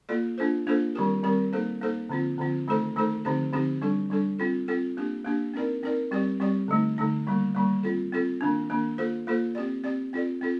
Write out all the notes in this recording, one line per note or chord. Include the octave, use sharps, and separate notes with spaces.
A#3 F4 A4 D5
A#3 D4 F4 A4 C5
A#3 D4 F4 A4 C5
D#3 G3 C4 G4 A#4
D#3 G3 C4 G4 A#4
A#3 D#4 A4 C5
A#3 D#4 A4 C5
D3 F3 C4 F4
D3 F3 C4 F4
D#3 A3 D#4 A4 C5
D#3 A3 D#4 A4 C5
D3 F3 C4 D#4 G4
D3 F3 C4 D#4 G4
G3 D4 A4
G3 D4 A4
C4 F4 A4
C4 F4 A4
A#3 D4 G4
A#3 D4 G4
C4 D#4 A#4 D5
C4 D#4 A#4 D5
G3 C4 G4 D5
G3 C4 G4 D5
D3 A3 D#4
D3 A3 D#4
D#3 G3 A#3
D#3 G3 A#3
C4 F4 A4
C4 F4 A4
D#3 A#3 D4
D#3 A#3 D4
A#3 F4 A4 C5
A#3 F4 A4 C5
C4 G4 D5
C4 G4 D5
C4 F4 A4 D5
C4 F4 A4